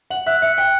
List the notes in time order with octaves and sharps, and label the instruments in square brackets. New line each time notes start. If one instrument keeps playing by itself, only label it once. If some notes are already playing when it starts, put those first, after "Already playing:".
[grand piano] F#5 [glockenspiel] F#7
[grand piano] E5 [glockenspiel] F#6
[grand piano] E5 [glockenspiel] C#7
[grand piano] G5 [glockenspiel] F#6